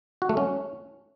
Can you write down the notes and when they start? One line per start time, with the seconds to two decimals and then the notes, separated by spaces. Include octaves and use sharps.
0.22 F#4
0.29 A3
0.37 C#4